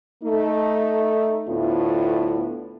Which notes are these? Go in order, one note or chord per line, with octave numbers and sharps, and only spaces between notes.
A3 D#4
D2 A2 B3 D4 E4 F4